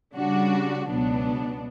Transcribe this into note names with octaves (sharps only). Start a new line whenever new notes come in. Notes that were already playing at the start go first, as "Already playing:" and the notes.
C#3 G3 D4 F#4
C#2 B2 F#3 B3 D4